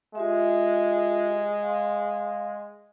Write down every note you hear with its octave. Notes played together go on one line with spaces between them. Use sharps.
G#3 F4 G4 E5
F5 C6